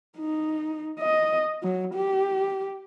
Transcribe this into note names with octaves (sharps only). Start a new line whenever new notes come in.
D#4
D#5
F#3
G4